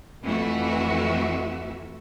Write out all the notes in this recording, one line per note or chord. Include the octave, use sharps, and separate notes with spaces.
F2 E3 A3 F#4 E5